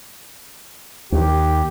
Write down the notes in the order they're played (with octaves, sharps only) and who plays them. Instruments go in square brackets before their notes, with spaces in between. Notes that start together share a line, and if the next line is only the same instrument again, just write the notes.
[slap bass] D#2 [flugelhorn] G4